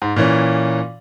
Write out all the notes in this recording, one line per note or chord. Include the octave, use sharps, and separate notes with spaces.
G#2
A#2 E3 C#4